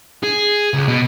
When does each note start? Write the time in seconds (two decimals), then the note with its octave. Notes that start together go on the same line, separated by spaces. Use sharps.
0.24 G#4
0.74 C#2
0.88 B2